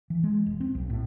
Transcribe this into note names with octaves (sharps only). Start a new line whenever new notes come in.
E3
G#3
E1
C4
B1
A2